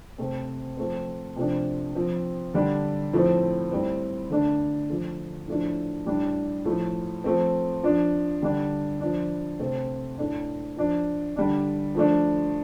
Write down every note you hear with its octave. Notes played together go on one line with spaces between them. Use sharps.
C3 A3 C4
F3 A3 C4
C3 F3 A3 D4
F3 C4
D3 G3 D4
A2 F3 A3 C4
A2 G3 C4
D3 A3 D4
D3 F3 A3
A2 F3 A3 D4
A2 G3 D4
A2 F3 A3
F3 A3 C4
F3 D4
D3 G3 D4
F3 D4
C3 A3 C4
A2 A3 D4
F3 D4
D3 G3 D4
F3 A3 D4